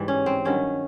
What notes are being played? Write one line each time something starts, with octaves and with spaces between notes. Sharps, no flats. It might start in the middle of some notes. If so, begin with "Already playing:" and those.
Already playing: G#2 E3 G3
C#4
C4
G2 D#3 F#3 C#4